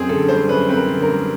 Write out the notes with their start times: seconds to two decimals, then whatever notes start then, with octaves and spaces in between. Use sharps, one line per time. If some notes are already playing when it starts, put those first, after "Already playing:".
Already playing: F#2 C4 G#4
0.09 D3 A4
0.28 G3 C5
0.49 F#2 B4
0.69 C4 B4
0.76 A#4
0.89 D3
1.02 A#4
1.09 G3